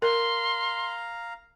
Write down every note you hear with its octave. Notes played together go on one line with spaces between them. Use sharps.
A#4 F5 A#5 C6